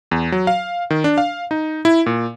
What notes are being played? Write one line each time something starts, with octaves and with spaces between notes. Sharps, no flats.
E2
F#3
F5
D#3
D4
F5
D#4
E4
A#2